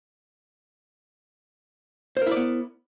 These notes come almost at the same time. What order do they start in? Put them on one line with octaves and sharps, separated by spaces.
C5 A#4 E4 D5 B3